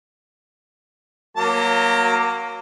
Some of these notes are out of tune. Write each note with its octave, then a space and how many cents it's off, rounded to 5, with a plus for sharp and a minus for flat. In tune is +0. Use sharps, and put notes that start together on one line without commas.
F#3 +0 A#3 +10 A#5 -40